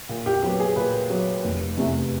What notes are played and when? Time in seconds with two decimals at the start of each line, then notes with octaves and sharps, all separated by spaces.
0.09 A#2
0.26 G4
0.42 F#3 B3 G4
0.60 G#4
0.76 A#2 B4
1.10 F#3 B3
1.44 F1
1.77 E2 C3 E3 A3